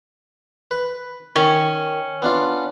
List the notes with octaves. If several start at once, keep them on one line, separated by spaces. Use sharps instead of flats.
B4
D#3 C#4
B3 D4 F4